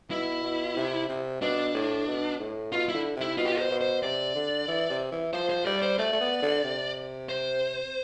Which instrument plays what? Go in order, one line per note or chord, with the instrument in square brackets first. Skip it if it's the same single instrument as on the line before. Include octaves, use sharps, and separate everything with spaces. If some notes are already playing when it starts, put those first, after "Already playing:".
[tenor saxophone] B2 [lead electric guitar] E4
[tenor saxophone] B2
C3
C3
[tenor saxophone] B2 [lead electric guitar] D4
[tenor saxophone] A2
B2
A2
[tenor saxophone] B2 [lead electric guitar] F4
[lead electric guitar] E4
[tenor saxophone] D3
[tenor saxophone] C3 [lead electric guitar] E4
[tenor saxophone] B2 [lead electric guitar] F4
[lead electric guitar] G4
F4
C5
[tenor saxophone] B2
[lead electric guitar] C5
[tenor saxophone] C3 [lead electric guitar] D5
[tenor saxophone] D3
E3
C3
E3
[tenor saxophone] F3 [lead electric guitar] C5
[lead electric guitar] C5
[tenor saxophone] G3 [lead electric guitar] D5
[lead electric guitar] C5
[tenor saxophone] A3 [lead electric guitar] D5
[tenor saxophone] A3
B3
D3
C3
[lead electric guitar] C5